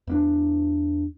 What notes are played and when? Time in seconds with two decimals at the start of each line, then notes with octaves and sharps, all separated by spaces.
0.07 E2 A#3 D4